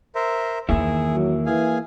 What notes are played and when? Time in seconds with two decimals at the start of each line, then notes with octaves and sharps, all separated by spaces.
0.15 A#4 C5 E5
0.69 E2 D#3 A#3 E4 G#4 E5
1.14 F#3
1.46 E3 G#4 F5 G#5